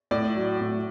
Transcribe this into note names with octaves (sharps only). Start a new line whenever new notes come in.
A2 D5
F#3
A2